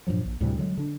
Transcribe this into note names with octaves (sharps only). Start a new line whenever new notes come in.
G2 A#2 F3 F#3
A#1
D2 A2 C3 G3
D3 F#3 G#3
D3 D4